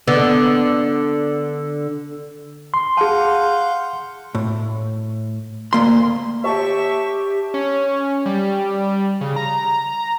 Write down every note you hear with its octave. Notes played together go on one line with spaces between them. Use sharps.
D3 B3
C6
G#4 F5 F#5 A5 G6
A2
D2 A#3 C6
G4 C#5 E5 A5 C#6
C#4
G3
C#3
A#5